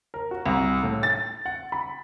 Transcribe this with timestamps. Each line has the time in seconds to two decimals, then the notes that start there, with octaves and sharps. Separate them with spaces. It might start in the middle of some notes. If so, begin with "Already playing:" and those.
0.14 A#4
0.31 F#4
0.46 C2
0.83 A2
1.03 A6
1.46 F#5
1.72 B5